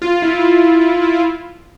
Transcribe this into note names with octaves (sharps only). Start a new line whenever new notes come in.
F4
E4
F4
E4
E4
E4
F4